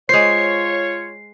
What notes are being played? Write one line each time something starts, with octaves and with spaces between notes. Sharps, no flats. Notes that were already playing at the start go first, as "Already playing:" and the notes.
G#3 F4 C5 C#5 C7